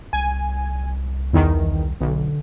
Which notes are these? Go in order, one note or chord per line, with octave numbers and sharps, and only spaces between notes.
C2 G#5
E2 D#3
B1 D3